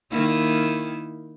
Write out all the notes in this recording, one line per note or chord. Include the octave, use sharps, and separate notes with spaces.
D#3 A#3 E4